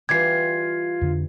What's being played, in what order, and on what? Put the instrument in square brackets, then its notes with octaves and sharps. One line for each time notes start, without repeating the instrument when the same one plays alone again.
[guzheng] E3 G3 G4 [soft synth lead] F4 [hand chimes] G#6 C7
[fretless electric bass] F2 D3 D4